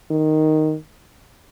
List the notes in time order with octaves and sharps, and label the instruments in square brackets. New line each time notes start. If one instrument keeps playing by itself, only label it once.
[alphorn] D#3